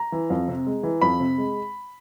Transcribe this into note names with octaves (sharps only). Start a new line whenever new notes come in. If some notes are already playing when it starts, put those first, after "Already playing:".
Already playing: A#5
E3
F2
C3
G#3
E3
F2 B5
C3
G#3